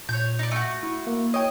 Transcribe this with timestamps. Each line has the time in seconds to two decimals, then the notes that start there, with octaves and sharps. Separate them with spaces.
0.09 A#2 C#5 G6
0.39 D#4 D5
0.51 A3 F#4
0.83 E4
1.07 A#3
1.34 C#5 D#5 G5